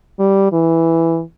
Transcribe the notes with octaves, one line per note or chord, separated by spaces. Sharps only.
G3
E3